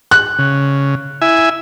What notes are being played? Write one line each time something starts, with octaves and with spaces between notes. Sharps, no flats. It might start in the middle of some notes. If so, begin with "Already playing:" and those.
F#6
C#3
E4 E5 G#5